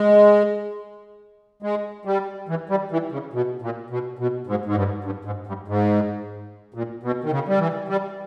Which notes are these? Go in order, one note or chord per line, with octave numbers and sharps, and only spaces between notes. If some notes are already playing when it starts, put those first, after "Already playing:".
Already playing: G#3
G#3
G3
E3
G3
E3
C#3
B2
A#2
B2
B2
G#2
G#2
G2
G2
G#2
G2
G#2
A#2
B2
D#3
C#3
G3
E3
G3